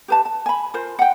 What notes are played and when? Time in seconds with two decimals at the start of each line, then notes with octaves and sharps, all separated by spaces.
0.08 G4 B4 A5
0.25 A5
0.46 G#5 B5
0.74 F4 A#4 C5
0.99 F#5 G5